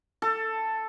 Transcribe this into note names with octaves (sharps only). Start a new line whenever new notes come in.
A4